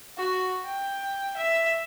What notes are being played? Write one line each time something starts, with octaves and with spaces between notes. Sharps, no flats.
F#4
G5
E5